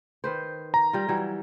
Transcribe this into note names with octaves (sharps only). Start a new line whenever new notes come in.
D#3 B4 C5
A#5
G3 F4
E3 F#3 G3